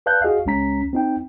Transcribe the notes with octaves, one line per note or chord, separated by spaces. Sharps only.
B4 D5 F5 A5 F#6 G6
F#4 G#4 D#5 F5
C#2 G#3 C#4 A#5 B6
C4 D#4 G5